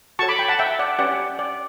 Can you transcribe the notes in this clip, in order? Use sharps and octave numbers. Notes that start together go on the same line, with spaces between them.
F#4 A4 C#5 A5 C#6
B5 D6
G5 B5
F#5 A5
E5 G5
D5 F#5
C#4 G4 B4 D5 F#5
D5